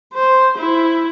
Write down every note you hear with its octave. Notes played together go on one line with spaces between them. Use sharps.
C5
E4